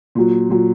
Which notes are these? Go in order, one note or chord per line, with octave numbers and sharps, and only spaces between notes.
A#2 F#3
A#2 F#3